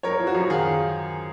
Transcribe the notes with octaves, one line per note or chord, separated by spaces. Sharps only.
F#2 A#4 C#5
F3
F#4
F#2
D#3 F4 G#4